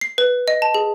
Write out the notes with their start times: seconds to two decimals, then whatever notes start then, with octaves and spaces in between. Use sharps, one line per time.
0.01 C7
0.18 B4
0.48 D#5
0.62 A5
0.74 G#4